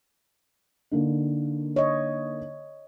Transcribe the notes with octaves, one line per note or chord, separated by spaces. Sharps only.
D3 A#3 D#4
C#5 D#5